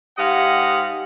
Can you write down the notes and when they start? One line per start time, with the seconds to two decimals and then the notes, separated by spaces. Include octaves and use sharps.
0.18 G#2 G4 D#5 F5 F#5